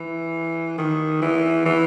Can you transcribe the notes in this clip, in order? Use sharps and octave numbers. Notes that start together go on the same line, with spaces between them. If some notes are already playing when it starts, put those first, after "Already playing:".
Already playing: E3
D#3
E3
E3